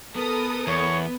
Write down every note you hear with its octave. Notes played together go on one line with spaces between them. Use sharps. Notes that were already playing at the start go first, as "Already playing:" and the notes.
B3 A4 A#4 D#6
E2 C#5